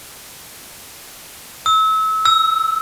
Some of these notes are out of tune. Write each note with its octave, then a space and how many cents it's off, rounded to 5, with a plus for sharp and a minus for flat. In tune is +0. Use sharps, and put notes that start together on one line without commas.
E6 -30
E6 +0